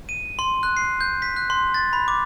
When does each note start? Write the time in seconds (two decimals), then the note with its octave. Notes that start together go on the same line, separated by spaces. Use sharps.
0.09 D#7
0.39 C6
0.63 F#6
0.77 C7
1.01 G6
1.22 B6
1.36 F#6
1.50 C6
1.74 A6
1.93 B5
2.08 D6